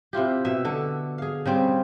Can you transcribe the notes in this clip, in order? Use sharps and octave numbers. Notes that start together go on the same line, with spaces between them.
C3 E4 F4 G4
B2 E5
D3 A4
G#4 F5
C#3 G3 C4